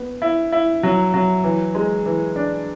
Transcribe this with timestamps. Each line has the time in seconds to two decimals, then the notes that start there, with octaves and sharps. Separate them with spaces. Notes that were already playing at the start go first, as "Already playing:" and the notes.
Already playing: B3
0.22 E4
0.52 E4
0.83 F#3
1.14 F#3
1.44 E3
1.75 G#3
2.06 E3
2.36 D4